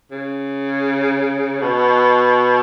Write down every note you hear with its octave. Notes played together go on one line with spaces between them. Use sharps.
C#3
B2